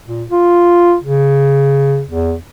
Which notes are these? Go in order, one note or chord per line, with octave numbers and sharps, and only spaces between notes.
A#2
F4
C#3
E2